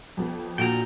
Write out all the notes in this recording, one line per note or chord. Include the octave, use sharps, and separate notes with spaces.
F2 B3
A#2 D3 F#4 G5 A#5